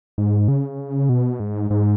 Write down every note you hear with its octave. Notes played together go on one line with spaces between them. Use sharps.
G#2
C#3
B2
G#2
G#2